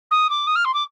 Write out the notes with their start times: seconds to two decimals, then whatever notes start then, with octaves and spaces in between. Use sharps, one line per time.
0.11 D#6
0.30 D6
0.47 D#6
0.55 F6
0.65 C6
0.74 D6